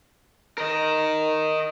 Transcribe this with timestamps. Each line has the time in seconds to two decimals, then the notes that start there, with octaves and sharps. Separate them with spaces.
0.58 A#4 D#5